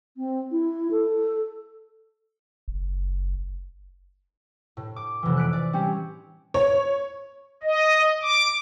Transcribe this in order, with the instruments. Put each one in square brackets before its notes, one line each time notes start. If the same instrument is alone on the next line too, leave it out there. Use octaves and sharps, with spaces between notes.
[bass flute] C4
E4
A4
[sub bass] F#1
[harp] A2
D6
F1 E3
F#6 B6 D7
D5
G3 C4 C#4
[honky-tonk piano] C#5
[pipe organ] D#5
D6